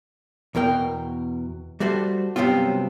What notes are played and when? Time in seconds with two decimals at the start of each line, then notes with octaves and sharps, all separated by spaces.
0.55 E2 B2 A#4 G5
1.80 G3 A3 F#4 A4 C5
2.36 G2 C3 F#3 B3 C4 F4